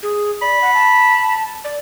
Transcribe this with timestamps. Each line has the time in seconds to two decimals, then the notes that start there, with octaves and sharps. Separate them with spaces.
0.03 G#4
0.42 D5 B5
0.62 F#5
0.74 A5
1.64 D5